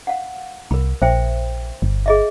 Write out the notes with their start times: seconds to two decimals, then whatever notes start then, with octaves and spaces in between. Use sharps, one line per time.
0.07 F5 F#5
0.71 C2 A#4 B5
1.02 A#1 C5 E5 G5
1.82 G1
2.06 G#4 D#5 E5